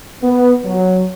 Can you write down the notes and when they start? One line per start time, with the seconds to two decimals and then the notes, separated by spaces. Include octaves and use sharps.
0.23 B3
0.65 F#3